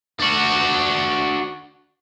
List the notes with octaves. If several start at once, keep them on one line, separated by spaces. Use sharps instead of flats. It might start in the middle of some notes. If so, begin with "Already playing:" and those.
D4 F#4